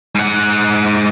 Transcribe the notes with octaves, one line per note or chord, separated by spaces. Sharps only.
G#2 F#5